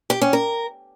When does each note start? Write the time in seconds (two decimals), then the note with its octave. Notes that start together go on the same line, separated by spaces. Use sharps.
0.10 G4
0.21 C#4
0.33 A#4